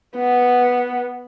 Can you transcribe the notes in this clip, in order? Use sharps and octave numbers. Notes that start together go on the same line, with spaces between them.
B3